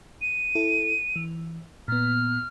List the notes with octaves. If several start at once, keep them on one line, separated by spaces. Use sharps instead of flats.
D#7
E4 A4
E3
A#2 B3 F6